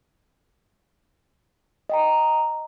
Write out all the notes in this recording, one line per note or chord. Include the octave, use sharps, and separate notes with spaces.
D#5 G5 A#5